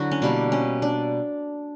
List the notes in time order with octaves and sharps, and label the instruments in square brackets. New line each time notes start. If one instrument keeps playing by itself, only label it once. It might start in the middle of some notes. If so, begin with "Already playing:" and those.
Already playing: [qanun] D3 F#3 E4 F#4
C#4
B2 G3 A#3 D4
C#4
D4